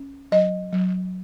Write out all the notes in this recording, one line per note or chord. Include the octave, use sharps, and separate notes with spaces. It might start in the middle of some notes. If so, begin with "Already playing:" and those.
Already playing: C#4
F#3 D#5
F#3